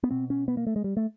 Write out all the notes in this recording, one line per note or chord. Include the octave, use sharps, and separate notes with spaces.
B3
B2 C4
C#4
B3
A#3
A3
G#3
G3
A3